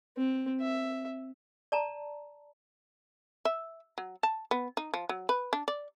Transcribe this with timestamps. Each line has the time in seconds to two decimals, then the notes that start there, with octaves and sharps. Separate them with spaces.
0.17 C4
0.60 E5
1.72 D5 A5 A#5
3.45 E5
3.98 F#3
4.23 A5
4.51 B3
4.77 D#4
4.94 F3
5.09 F#3
5.29 B4
5.53 D4
5.68 D5